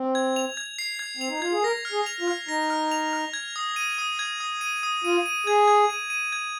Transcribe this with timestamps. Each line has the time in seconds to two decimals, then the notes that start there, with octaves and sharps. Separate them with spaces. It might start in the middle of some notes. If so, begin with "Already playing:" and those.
Already playing: C4
0.15 G#6
0.36 F7
0.57 G#6
0.79 C7
0.99 G#6
1.17 C4 F7
1.29 D#4
1.41 F4 G#6
1.52 G#4
1.64 A#4 A#6
1.85 F6
1.92 G#4
2.06 F7
2.21 F4
2.28 F6
2.48 D#4 A#6
2.70 F6
2.91 F7
3.13 F6
3.34 G#6
3.56 D#6
3.76 D#7
3.98 D#6
4.19 G#6
4.40 D#6
4.61 D#7
4.83 D#6
5.04 F4 D#7
5.26 D#7
5.46 G#4 G#6
5.68 G#6
5.90 D#7
6.10 D#7
6.33 G#6